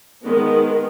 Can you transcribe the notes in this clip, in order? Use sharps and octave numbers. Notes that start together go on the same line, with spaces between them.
D#3 G#3 B3